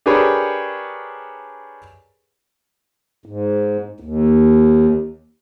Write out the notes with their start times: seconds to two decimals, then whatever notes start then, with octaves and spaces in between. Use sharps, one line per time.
0.06 D4 G4 G#4 A#4 B4 C#5
3.26 G#2
4.00 D#2